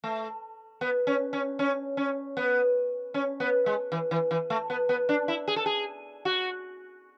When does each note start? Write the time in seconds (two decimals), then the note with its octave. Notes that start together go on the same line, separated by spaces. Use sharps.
0.04 A3
0.81 B3
1.07 C#4
1.33 C#4
1.59 C#4
1.97 C#4
2.37 B3
3.14 C#4
3.40 B3
3.66 G#3
3.92 E3
4.11 E3
4.31 E3
4.50 A3
4.70 B3
4.89 B3
5.09 D4
5.28 E4
5.48 G#4
5.56 A4
5.66 G#4
6.25 F#4